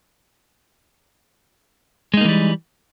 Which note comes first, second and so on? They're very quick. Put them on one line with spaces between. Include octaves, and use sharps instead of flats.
G#3 D#4 A#3 E3 G3